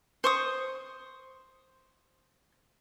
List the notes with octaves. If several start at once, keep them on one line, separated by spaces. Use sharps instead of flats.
C5 C#6 D#6